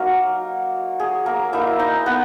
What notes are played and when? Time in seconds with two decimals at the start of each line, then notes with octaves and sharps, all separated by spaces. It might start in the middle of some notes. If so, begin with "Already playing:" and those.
Already playing: F#3 A#3 D#4 A#4
1.00 G#4
1.26 A#3 A#4
1.53 A#3 D#4 E4 E5
1.79 D#4 D#5
2.06 B3 B4